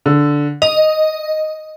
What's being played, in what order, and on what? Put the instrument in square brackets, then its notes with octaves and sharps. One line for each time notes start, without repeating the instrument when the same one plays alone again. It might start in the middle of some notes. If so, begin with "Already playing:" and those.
[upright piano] D3
[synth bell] D#5 [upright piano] F7